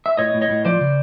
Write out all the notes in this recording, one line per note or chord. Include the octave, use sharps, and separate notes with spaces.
E5
A2 C#5 D#5
A2
C#5 D#5
A2
F3 C5 D5
C#3